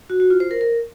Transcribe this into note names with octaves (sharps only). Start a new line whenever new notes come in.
F#4
F#4
F4
C5
A#4
A#4